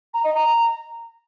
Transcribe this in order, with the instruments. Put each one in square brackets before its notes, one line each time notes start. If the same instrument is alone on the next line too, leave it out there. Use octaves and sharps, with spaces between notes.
[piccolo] A#5
D#5
A#5